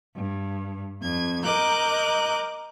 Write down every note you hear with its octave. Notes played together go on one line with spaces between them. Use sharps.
G2
F2 G#6
A#4 D#5 A#5 D6 F#6 G6